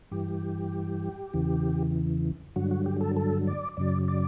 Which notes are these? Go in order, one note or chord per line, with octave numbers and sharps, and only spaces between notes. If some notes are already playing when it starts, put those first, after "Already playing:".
G2 E3 G4
E2 C#3 E3
G2 D3 F#3 F#4
F#4
G4
A4
A4
D5
F#2 C#3 F#3 D5
D5